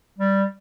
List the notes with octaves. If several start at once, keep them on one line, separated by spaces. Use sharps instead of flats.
G3